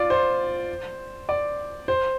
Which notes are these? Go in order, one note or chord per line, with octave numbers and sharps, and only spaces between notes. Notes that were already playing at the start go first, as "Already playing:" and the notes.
Already playing: F4 D5
C5
D5
C5